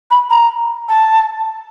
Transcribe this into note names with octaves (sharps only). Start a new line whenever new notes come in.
B5
A#5
A5